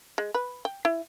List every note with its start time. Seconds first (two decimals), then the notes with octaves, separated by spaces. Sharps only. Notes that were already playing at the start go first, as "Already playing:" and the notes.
0.18 G#3
0.35 B4
0.65 G5
0.85 E4